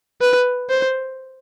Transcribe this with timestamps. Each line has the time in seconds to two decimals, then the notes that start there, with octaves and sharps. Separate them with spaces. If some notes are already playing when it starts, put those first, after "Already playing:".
0.21 B4
0.70 C5